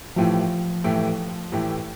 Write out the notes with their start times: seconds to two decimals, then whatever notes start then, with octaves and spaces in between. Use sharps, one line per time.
0.16 A2 E3 F3 A3 E4 G4
0.84 A2 E3 A3 E4 G4
1.52 A2 E3 A3 E4 G4